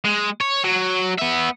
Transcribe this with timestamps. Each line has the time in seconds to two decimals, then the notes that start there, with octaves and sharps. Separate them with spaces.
0.05 G#3
0.41 C#5
0.64 F#3
1.19 B3 E5